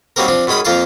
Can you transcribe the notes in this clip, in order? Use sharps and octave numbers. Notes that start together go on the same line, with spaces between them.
D#3 F#3 G3 A#3 C4 A#4
F3 C4 D4
F#2 D#3 G#3 B5 D#6
F2 A#3 F4 F5 A5